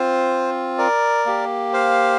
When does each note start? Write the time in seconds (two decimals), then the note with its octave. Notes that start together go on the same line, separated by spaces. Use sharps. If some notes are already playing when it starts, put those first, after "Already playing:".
Already playing: C4 F4 C5
0.78 A#4 D5
1.26 A#3 G4
1.73 C5 F5